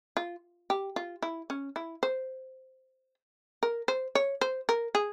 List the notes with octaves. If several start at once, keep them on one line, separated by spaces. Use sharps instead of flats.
F4
G4
F4
E4
C#4
E4
C5
A#4
C5
C#5
C5
A#4
G#4